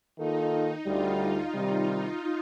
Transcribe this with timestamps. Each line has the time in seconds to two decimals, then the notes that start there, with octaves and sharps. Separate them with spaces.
0.17 D#3 A#3 D#4 F4 A4
0.85 D2 D3 G3 F4
1.53 C3 D#3 G3